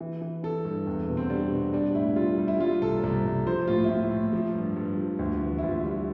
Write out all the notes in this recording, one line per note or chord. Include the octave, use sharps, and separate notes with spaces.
E3
E3
E3 A4
G2
E2
B2
C4
G3 D4
B2
G3 D4
A2 E4
G3 F4
G3
E4
G3 F4
C2 A4
C2
C2
F3 C5
A2 F4
E4
A2 F4
A2
F3
G2
G2
F3
D2
E3
E4
D2 F4
G3 E4